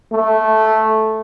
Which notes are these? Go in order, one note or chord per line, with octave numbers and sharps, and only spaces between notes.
A3